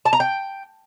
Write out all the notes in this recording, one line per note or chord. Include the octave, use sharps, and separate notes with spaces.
A5
A#5
G5